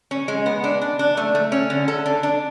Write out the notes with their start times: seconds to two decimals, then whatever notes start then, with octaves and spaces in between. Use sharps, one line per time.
0.11 C#4
0.28 G#3
0.46 B3
0.64 D4
0.81 D4
0.99 D4
1.17 A3
1.35 A3
1.52 C#4
1.70 D3
1.88 A4
2.06 D4
2.23 D4